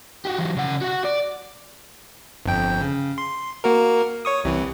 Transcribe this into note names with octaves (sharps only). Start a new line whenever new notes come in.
F#4 G4
E3 F#3
C#3 F#5
F#4 F#5
D5
G1 F2 G5
C#3
C6
A#3 F#4 A#4
C#5 C#6 D#6
C2 C3 E3